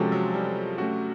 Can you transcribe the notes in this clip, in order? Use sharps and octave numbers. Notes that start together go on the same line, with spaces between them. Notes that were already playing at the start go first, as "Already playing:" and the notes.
Already playing: C3 F3 G#3 C#4 F#4 A4
F#3
G3
A3 C#4 F#4